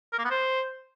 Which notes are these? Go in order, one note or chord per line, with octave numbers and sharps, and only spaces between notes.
A#4
A#3
B3
C5